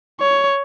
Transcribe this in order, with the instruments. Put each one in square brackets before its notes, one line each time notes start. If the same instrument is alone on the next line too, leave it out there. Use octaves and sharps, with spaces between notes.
[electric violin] C#5